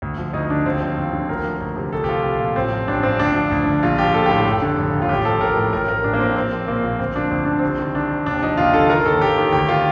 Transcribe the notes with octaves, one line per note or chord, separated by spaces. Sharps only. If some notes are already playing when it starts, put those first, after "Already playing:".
D2
F3
D2 D#4
D3 D4
D#2 C4
F3
D#2
D3
D2 A#4
F3
D2
C3
C2 A4
G4
F3 F4
C2
A#2
A1 C4
F3
A1 D4
G2 C4
D2 D4
F3
D2
D3
A#1 F4
F3 G4
A#1 A4
G4
A2 A4
F1
D3
F1
D#2
F4
A1 G4
F3 A4
A1 A#4
A2
A1 A#4
F3 A#4
A1 D4
A#3
A2 C4
A#1 C4
F3
A#1 A#3
A#2
D2 C4
F3 D4
D2 C4
D3 D4
C2 C4
D#3
C2 D4
C3
D#2 D4
F3 D#4
D#2 F4
D3 A4
D#3 A#4
D#2 A4
D#2 G4
D#3
D2 G4
D#3 F4